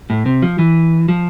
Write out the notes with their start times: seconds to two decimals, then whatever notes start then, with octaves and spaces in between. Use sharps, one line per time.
0.10 A2
0.26 C3
0.42 F3
0.59 E3
1.08 F3